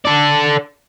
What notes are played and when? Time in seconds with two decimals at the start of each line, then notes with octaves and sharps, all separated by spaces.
0.05 A4 D5